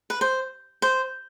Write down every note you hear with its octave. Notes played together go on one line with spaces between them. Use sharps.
B4
C5
C5